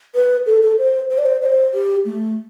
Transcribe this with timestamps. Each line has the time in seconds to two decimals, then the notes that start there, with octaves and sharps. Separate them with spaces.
0.15 B4
0.46 A4
0.62 A4
0.78 C5
1.10 C5
1.18 D5
1.26 C5
1.42 D5
1.46 C5
1.74 G4
2.05 A3